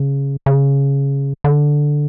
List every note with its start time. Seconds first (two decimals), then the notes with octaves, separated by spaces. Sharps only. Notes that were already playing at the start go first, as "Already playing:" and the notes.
Already playing: C#3
0.46 C#3
1.44 D3